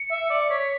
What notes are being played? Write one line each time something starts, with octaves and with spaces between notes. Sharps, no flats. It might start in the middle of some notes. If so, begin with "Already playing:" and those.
Already playing: C#7
E5
D5
C#7
C#5 B6